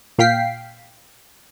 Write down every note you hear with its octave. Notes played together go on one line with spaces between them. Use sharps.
A#2 F5 G5 B6 C7